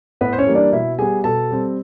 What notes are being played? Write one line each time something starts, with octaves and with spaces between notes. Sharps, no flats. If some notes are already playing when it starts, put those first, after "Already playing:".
A2 B3 B4
C5
C#4 C#5
E3 G3 A#3
D4 D5
B2 E4 E5
G3 B3 G#4 G#5
B2 A4 A5
G3 C4